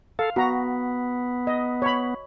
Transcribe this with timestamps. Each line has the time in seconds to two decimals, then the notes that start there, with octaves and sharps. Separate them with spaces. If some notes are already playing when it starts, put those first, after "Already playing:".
0.19 A4 F5
0.36 B3 F#4 A#5
1.47 D#5
1.82 C#5 B5